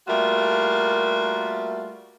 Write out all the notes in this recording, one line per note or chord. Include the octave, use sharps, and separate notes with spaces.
G3 A3 A#3 F4 F#4 A#4